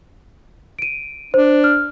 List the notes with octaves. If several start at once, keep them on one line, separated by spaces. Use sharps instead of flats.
D7 D#7
D4 C5
F6